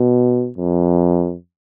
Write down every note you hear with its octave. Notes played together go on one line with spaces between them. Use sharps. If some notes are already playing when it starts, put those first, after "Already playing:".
Already playing: B2
F2